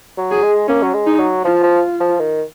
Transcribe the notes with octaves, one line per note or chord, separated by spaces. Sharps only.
F#3
G#4
G#3
A#3 C#4
F#3
G#3
D#4
F#3
F3 F4
F3
F3
D#3